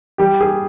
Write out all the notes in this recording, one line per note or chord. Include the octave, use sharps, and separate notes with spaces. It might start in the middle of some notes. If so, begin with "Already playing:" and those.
G3 G4
G#4